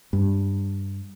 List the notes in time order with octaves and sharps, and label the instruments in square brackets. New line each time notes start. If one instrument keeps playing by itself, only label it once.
[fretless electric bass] G2